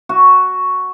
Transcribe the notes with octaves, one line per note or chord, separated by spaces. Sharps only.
F#4